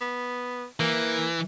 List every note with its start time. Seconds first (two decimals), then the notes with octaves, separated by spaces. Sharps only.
0.01 B3
0.80 E3 A#3